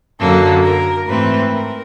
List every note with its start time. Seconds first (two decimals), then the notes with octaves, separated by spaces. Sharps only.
0.19 F#2 D3 F#3 A#3 A4
0.63 A#4
1.06 G#2 E3 A3 C4 B4
1.51 A#4